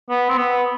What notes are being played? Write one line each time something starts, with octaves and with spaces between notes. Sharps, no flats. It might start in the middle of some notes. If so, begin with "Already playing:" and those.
B3
C4
B3